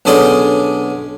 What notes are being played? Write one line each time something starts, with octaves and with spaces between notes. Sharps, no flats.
B1 D3 C#4 G#4 D5 C6